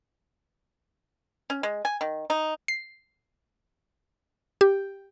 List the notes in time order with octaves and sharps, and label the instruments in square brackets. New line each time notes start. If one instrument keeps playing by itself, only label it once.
[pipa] C#4
G#3
G#5
D#3
D#4
[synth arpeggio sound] C7
G4